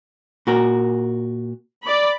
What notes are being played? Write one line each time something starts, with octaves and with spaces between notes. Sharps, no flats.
A#2 F#4 A#4
D5 B5